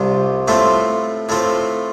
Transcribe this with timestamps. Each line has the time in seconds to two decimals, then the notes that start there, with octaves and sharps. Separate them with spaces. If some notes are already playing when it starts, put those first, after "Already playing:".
Already playing: C2 C3 G3 D4 F4
0.48 A2 A3 C4 F4
1.29 A2 A3 C4 F4